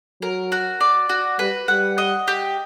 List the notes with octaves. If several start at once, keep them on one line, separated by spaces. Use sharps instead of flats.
F#3 A#4
F#4
D5
F#4
G3 B4
G3 F#5
D#5
G4